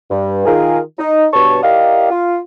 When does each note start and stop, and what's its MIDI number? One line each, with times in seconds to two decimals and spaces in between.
0.11 0.42 43
0.46 0.78 51
0.46 0.78 65
0.46 0.78 68
0.46 0.78 70
0.98 1.26 63
1.33 1.61 43
1.33 1.61 47
1.33 1.61 73
1.33 1.61 81
1.33 1.61 85
1.63 2.07 64
1.63 2.07 67
1.63 2.07 70
1.63 2.07 74
1.63 2.07 75
1.63 2.07 77
2.10 2.37 65